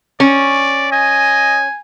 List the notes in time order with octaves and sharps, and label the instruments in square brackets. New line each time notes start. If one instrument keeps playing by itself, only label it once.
[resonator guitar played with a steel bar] C#4 [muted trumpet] D5
[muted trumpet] D#5 [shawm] G#5